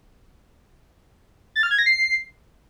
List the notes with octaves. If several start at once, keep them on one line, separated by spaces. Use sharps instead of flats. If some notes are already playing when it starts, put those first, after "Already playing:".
A6
F6
G#6
A#6
C7